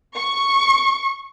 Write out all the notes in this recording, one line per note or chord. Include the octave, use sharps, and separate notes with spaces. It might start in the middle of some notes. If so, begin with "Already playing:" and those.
C#6